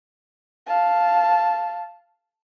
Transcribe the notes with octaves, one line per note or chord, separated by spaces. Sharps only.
F5 A5